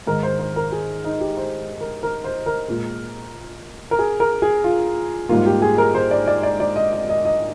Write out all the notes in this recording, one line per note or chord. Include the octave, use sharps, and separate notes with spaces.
G#2 D#3 G#3 A#4
C5
C5
A#4
G#4
D#4
G4
C5
A#4
A#4
C5
A#4
A#2 G#3
A#4
G#4
A#4
G#4
F4
G#2 G3 A#3 F4
G4
G#4
A#4
C5
D5
D5
D5
D5
D#5
D#5
D#5
D#5